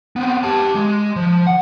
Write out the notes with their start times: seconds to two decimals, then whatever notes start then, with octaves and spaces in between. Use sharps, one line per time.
0.16 B3 C4
0.43 G4 A5
0.75 G#3
1.16 F3
1.47 F#5